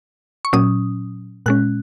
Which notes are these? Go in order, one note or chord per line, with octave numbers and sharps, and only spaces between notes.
C#6
A#2 F#3 C#4 D#6
A#2 G#3 C#4 F#6